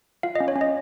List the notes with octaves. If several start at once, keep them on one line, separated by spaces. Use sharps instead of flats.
F4 F5
C#4 D#5
C#5
C#4
D#5